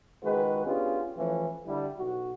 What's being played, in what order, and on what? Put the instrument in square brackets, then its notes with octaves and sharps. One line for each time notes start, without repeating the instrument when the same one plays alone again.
[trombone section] C#2 D#3 G#3 F#4 G#4 B4
B3 C#4 D4 F4 G4 G#4
E3 F3 A3 C#4 E4
D3 G3 E4
B1 F#4